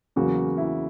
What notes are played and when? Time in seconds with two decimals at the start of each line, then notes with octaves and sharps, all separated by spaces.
0.16 E2 C#3 F#3 A#3 F#4
0.58 E4